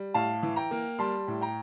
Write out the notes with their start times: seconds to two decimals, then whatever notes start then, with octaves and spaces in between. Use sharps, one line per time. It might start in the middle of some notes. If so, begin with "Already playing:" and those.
Already playing: G3
0.14 A2 F5 A5
0.43 E3
0.56 G5 A#5
0.71 A#3
0.99 G3 A5 C6
1.28 A2
1.41 G5 A#5